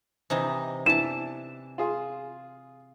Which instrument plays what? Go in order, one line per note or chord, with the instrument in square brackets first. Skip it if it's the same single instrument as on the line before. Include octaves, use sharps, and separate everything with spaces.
[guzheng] C3 E3 D#4
[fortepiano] E3 D4 [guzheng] E5 A5 [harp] E7
[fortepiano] F4 G#4 C6